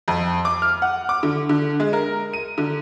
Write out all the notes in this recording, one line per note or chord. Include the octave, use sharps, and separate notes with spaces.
F2
D6
F6
F#5
D6
D3
D3
G#3
A#4
D#7
D3